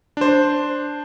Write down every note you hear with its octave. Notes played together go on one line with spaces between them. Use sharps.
D4 C5